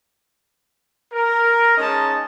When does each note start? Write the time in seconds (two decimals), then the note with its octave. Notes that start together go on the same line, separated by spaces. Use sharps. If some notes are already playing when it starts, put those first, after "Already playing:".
1.12 A#4
1.77 G#3 C#4 D#4 D#5 A5